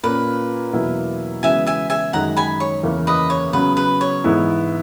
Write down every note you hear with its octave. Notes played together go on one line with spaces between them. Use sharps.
A#2 A#3 C#4 B4
E2 B2 F#3 A#3 E4
C#3 E3 G#3 B3 F#4 E5 G#5
E5 G#5
E5 G#5
F#2 D#3 G#3 D#4 F#4 F#5 A#5
G#5 B5
C#5
E2 C#3 E3 A#3 C#4
B4 D#5
C#5
C#3 F#3 B3 B4
B4
C#5
G#2 E3 G#3 B3 E4